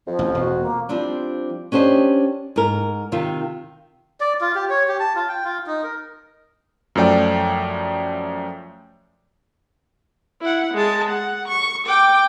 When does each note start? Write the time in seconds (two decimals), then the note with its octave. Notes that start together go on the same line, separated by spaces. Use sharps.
0.07 F2 F3
0.19 A1
0.35 E1 F#4
0.59 A#3
0.89 F3 G3 C4 D4
1.72 C#4 D4 G4 C5 D#5
2.56 G#2 A#4
3.12 C3 D#3 F4
4.20 D5
4.41 F4
4.55 G4
4.70 C#5
4.88 G4
5.00 A5
5.16 F4
5.29 G5
5.45 F4
5.67 D#4
5.83 A#4
6.95 F#2 F3 A3 D5 G5
10.41 E4 F#5
10.74 G#3 A5
11.09 F#5
11.48 C#6
11.86 G5 D6